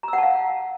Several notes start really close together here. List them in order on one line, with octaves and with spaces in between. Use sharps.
A#5 E6 F#5 A5 F5